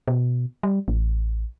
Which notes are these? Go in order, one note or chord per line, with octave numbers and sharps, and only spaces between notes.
B2
G3
A1